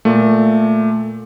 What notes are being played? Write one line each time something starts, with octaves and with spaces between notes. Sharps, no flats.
A#2 A3